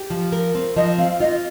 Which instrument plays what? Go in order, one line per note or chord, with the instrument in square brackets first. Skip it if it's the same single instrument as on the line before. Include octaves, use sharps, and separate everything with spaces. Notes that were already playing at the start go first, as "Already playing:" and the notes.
Already playing: [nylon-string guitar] G4
F3
A#4
C4
[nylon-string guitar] F3 [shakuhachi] D#5
[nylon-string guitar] C4 [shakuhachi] F5
[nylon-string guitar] F4 [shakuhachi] D#5